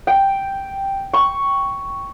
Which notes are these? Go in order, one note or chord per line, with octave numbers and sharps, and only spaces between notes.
G5
C#6